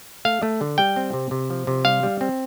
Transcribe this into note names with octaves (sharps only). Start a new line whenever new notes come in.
A3 F5
A3
D3
G3 G5
C4
C3
C3
F3
C3
G3 F5
G3
C4